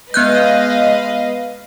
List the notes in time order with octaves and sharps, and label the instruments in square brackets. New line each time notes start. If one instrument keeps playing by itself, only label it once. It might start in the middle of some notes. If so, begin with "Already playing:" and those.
[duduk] G#3 [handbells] B3 F#6 G6 [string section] B4 D#5 F5